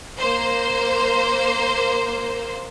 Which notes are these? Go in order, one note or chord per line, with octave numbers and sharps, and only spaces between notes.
A#3 C5